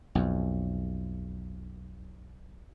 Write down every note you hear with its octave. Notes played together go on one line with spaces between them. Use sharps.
B1 F2